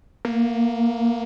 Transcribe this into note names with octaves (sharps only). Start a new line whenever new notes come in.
A#3